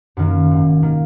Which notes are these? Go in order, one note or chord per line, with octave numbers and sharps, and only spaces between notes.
F#2 D#3 A#3
G#1
D#3 A#3